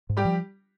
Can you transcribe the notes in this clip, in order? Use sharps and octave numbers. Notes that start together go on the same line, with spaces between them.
G#2
G3 G4
F3